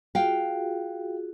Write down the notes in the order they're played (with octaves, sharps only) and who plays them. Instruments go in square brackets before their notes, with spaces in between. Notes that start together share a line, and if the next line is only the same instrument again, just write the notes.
[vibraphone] F4 F#4 G#4 [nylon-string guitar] F5 G5